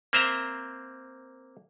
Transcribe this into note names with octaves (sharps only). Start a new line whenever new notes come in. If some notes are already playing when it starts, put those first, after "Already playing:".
A#3 C4 C5 E5 A#5